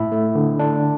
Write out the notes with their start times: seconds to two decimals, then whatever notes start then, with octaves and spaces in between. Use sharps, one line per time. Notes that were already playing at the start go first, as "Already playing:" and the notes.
Already playing: A2 E4 E5
0.12 A3
0.35 D3
0.59 D4